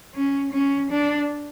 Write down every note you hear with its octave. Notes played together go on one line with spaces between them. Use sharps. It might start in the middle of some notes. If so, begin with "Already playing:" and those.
C#4
C#4
D4